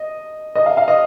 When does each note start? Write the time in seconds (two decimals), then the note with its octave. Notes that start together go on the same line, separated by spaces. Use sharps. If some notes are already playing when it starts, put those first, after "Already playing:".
Already playing: D#5
0.55 D#5
0.66 F5
0.77 F5
0.88 D#5